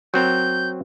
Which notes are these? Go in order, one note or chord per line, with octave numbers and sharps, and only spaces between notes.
F#3 C4 A#4 G6